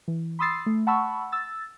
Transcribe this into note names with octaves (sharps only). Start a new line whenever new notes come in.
E3
B5 C6 D#6 E6 A6 C7
A3
F#5 A5 B5 C#6 E6
E6 A6